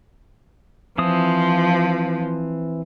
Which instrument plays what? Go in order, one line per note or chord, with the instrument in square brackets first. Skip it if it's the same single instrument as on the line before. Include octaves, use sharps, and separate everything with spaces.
[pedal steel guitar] E3 C4 D#6 [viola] F3